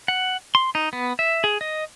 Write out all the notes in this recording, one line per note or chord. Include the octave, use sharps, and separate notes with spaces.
F#5
C6
D#4
B3
E5
G#4
D#5